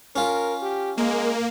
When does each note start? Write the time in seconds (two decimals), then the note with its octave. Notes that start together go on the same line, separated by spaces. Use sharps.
0.16 C#4 F4 A#4
0.62 G4
0.98 G#3 A#3